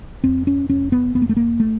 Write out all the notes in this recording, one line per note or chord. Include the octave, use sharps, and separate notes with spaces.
F2 C4
C#4
F1 C#4
B3
F1 B3
A#3
A3
A#3
A3